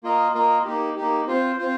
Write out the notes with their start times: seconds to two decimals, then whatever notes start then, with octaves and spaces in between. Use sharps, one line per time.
0.03 A#3 F4 A#4 D#5
0.34 A#3 F4 A#4 D#5
0.65 A#3 D#4 G4
0.96 A#3 D#4 G4
1.27 C4 F4 C5
1.58 C4 F4 C5